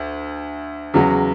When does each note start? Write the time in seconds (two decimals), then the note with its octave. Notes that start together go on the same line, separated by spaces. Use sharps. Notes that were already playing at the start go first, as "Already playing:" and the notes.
Already playing: D2
0.94 E2 C#3 F#3